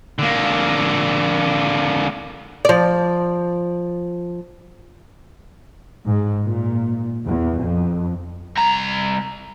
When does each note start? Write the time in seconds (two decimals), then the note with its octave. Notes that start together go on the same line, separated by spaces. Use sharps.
0.19 D3 A#3
2.65 F3 D5
6.07 G#2
6.44 A#2
7.24 E2
7.60 F2
8.58 C2 A#5